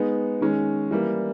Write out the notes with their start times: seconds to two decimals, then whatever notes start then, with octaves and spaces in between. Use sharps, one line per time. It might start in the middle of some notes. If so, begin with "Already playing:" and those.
Already playing: G#3 B3 D#4
0.41 D#3 G#3 C#4
0.91 E3 G3 A#3